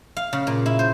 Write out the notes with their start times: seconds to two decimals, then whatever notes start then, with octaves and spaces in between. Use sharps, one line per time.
0.17 F5
0.33 C#3
0.47 A#2
0.66 E4
0.79 C5